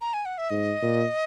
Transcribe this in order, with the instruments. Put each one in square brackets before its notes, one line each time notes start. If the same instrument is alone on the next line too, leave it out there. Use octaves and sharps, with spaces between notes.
[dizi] A#5
G#5
F#5
E5
[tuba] G#2 [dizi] D#5
[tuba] A#2